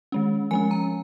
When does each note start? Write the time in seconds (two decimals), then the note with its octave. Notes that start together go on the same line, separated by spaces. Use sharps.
0.12 D#3 G#3 C#4
0.51 F3 G#3 C#4 G#5
0.71 A#5